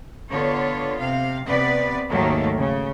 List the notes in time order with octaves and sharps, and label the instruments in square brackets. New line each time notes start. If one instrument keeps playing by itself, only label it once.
[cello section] D3 B3 F4 C#5
C3 F5
C3 B3 B4 D5
D#2 G#2 D#3 F#3 A3 A#3
C#3